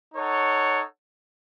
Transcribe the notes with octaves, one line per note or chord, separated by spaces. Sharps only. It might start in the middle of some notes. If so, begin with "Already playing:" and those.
D#4 A4 C#5 F#5